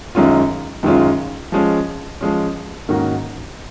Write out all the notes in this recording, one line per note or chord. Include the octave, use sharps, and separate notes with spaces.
F#2 D#3 G#3 C#4 F4
F#2 D#3 G#3 C#4 F4
F3 G#3 C#4
F3 G#3 C#4
G#2 D#3 A#3 C#4 F#4